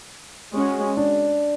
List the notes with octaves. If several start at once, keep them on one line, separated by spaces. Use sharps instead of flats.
G#3 C#4 F#4
D4